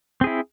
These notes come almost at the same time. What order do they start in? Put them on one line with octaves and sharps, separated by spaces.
C4 G#4 E4